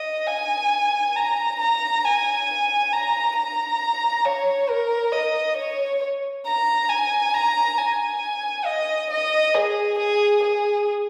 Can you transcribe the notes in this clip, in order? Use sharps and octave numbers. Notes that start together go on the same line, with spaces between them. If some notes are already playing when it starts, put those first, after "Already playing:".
Already playing: D#5
G#5
A#5
A#5
G#5
A#5
A#5
C#5
A#4
D#5
C#5
A#5
G#5
A#5
G#5
D#5
D#5
G#4
G#4
G#4